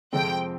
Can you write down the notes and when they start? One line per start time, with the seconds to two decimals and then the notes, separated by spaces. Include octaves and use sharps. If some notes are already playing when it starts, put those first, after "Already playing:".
0.13 F2 C3 F3 G#3 C4 G5